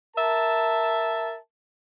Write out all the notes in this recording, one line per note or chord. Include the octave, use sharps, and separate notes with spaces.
A#4 E5 A5